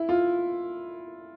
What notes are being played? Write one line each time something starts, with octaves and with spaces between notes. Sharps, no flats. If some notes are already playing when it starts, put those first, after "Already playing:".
Already playing: E4
F4